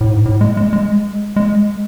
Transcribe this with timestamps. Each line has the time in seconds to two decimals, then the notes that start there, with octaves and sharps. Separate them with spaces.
0.01 A2
0.10 G#2
0.25 A2
0.41 G#3
0.57 G#3
0.73 G#3
1.36 G#3